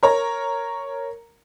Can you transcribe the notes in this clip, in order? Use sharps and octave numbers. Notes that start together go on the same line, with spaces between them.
A#4 C#5 A#5